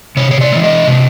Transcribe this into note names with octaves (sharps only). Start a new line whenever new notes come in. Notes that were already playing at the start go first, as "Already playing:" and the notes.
C3 C#5
C#5
D5
E3 G#3
D#5
C3